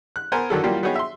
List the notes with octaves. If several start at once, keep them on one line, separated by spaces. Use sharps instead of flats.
F#6
B3 A#4 C5 G#5
D3 D#3 F#3 A4
E3 F#3 G3 A#3 F4 G4
F#3 B3 D#4 G4 G#4 C#5
E5 C6